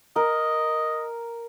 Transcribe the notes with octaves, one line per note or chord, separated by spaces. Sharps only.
A#4 D#5